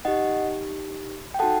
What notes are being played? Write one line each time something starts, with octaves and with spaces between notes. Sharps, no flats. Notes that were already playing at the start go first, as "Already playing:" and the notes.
D#4 G4 D#5 F#5
G5
D#4 F#4 A4 F#5 A5